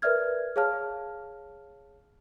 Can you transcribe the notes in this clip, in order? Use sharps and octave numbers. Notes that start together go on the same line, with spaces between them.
A#4 B4 D5 E5 F6 G#6
G#4 C#5 F5 A5 F6